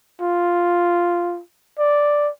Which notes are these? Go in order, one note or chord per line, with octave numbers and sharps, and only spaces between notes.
F4
D5